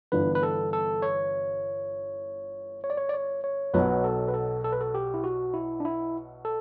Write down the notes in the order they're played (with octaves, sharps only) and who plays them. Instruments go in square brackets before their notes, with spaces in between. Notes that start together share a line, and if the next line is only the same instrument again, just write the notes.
[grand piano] G1 G2 E3 B3 D4 [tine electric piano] B4
[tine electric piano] B4
A4
A4
C#5
C#5
D5
C#5
D5
C#5
C#5
[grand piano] B1 B2 F#3 [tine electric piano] B4
[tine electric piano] A4
B4
A4
A4
B4
A4
G4
E4
F#4
E4
D4
E4
A4